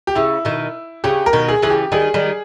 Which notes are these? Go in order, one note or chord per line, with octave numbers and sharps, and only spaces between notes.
G4
C#3 E4
B2 D#3
C#3 G4
A#4
B2 D#3
G#4
C#3 E3 G#4
G4
D#3 G3 G#4
D#3 G3